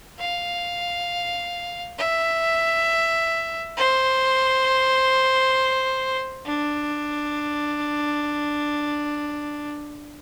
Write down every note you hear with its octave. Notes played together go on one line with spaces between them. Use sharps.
F5
E5
C5
D4